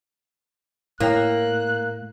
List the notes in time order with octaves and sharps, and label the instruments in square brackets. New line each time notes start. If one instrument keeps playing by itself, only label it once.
[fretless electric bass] A2 [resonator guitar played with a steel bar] A#3 [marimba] E4 C#5 G5 [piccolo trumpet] F#6